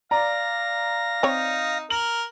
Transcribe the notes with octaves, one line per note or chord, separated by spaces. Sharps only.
D5 F5 A#5 A#6
C4 D#4 C#5
A#4 F#7